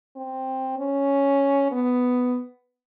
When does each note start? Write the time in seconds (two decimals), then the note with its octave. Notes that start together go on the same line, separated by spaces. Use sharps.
0.16 C4
0.78 C#4
1.71 B3